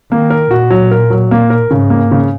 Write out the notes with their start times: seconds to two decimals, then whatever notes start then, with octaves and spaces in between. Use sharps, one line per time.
0.11 D#3 A#3
0.30 A#4
0.51 A#2 F#4
0.70 F#3
0.91 A#4
1.10 F#3
1.31 A#3
1.50 A#4
1.70 G#2 C#3
1.90 A#3
2.11 C#3